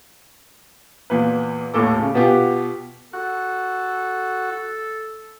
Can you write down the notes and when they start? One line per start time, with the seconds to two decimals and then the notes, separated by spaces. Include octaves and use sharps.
1.10 E2 A#2 B4
1.74 D#2 A2 A4 D6
2.00 C#3
2.14 B2 B3 F4 G4
3.13 F#4 A4